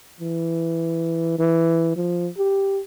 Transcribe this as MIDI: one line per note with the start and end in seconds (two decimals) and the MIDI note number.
0.20 1.38 52
1.39 1.93 52
1.96 2.28 53
2.38 2.81 67